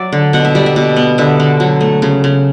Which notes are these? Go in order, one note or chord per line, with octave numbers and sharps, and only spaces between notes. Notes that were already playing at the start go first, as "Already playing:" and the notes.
Already playing: F#3 D5 E5
D3
B2 F#5
E5
G3 D5
E5
B2
B3
D3 E5
D3
F#3
A3
C#3
C#3